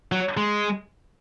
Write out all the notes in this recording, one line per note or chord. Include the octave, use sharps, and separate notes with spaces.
F#3
G#3